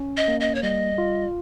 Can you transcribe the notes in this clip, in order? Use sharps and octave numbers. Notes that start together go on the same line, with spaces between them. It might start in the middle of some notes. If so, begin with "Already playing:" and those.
Already playing: C#4
D#5
A#3
D#5
C#5
G3 D#5
F4